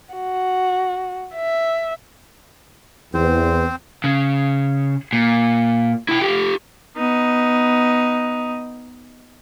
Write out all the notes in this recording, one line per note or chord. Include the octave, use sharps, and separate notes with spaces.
F#4
E5
E2 C4 C5
C#3
A#2
E4 G5
F4 G4
B3 D#4